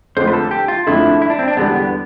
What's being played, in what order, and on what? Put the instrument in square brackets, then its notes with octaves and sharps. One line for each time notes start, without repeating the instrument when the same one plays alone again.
[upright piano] F2 D3 F3 A3 D4 [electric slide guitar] C5
[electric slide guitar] B4
A4
G4
F4
[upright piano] F2 D3 F3 A3 D4 [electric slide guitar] E4
[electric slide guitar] E4
D4
C4
D4
[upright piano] E2 D3 G3 [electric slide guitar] B3